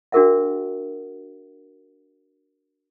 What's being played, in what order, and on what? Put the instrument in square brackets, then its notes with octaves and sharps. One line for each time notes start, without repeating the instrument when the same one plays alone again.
[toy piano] D4 F#4 G#4 A#4 E5 F#5